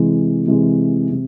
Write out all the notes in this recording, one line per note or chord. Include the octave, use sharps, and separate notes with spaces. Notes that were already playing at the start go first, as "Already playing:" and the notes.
Already playing: C3 E3 G#3
C3 E3 G#3
C3